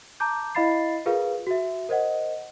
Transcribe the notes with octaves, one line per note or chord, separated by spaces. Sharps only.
A5 A#5 D6 G6
E4 D#5 F5 B5 A6 C7
F4 G#4 A#4 B4 F5
F#4 E5
A#4 C5 D#5 F#5